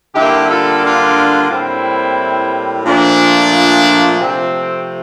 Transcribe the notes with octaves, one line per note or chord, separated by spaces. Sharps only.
D3 G3 A#3 E4 G4
F4 A4
D4 F4
A2 G3 A#3 C4 E4
A#2 F3 A3 D4
C3 F3 A3 C4